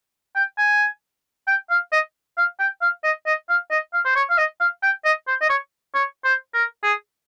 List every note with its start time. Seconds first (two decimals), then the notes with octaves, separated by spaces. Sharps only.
0.36 G5
0.58 G#5
1.47 G5
1.70 F5
1.92 D#5
2.37 F5
2.59 G5
2.82 F5
3.04 D#5
3.26 D#5
3.49 F5
3.71 D#5
3.93 F5
4.05 C5
4.16 C#5
4.30 F5
4.38 D#5
4.60 F5
4.83 G5
5.05 D#5
5.27 C5
5.41 D#5
5.50 C#5
5.95 C#5
6.24 C5
6.54 A#4
6.83 G#4